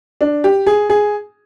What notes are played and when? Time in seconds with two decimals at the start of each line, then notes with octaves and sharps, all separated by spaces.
0.21 D4
0.44 G4
0.66 G#4
0.90 G#4